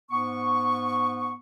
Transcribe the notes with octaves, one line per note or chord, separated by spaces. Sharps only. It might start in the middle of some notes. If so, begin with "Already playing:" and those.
G#2 B3 C#6